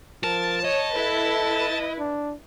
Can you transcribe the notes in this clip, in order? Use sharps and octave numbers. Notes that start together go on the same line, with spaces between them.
F3 A#4 A5
C#5 D#5
E4 A4 B4
D4